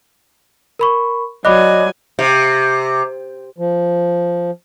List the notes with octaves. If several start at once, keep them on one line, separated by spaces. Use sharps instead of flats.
A#4 B5 C#6
F#3 D5 D#5 G#5 B5 D6 F#6
C3
F3